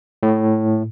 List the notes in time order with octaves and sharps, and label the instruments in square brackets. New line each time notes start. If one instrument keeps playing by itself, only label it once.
[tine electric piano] A2